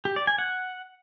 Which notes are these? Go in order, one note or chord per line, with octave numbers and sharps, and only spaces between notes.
G4
D5
G#5
F#5